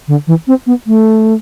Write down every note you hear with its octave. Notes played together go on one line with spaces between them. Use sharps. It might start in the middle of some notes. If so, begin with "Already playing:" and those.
D3
E3
C4
B3
A3